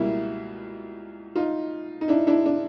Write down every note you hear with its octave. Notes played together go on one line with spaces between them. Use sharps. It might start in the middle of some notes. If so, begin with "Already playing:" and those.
Already playing: C#2 B2 G3 A#3 E4 F#4
D#4 F4
D#4
D4 E4
D4 E4
D4